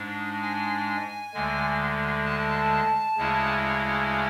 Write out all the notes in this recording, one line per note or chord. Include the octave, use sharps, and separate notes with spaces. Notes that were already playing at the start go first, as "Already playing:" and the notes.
Already playing: G#2 G#3 D4
G#5
D2 D3 G#3
A5
D2 C#3 G#3 C#4 E4